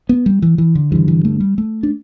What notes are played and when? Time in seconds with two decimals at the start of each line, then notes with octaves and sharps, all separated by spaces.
0.09 B3
0.26 G3
0.42 E3
0.58 E3
0.75 D3
0.92 G2 D3 E3
1.08 E3
1.25 A3
1.40 G3
1.58 A3
1.83 D4